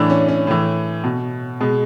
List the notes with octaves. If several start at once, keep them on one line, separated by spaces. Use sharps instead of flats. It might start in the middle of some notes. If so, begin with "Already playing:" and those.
Already playing: A2 E3 D4
C#4
C#4
A2 E3
B2
B2 G#3